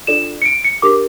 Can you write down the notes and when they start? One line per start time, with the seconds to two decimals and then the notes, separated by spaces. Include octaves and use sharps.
0.07 D4 F4 A4 D5 E7
0.42 C#7
0.46 D7
0.64 C#7
0.82 D4 G4 A#4 D6